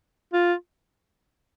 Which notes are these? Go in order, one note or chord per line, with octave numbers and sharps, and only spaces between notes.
F4